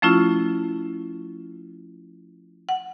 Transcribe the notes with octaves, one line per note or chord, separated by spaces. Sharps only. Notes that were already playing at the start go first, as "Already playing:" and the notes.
F3 A3 C#4 E4 F4
F#5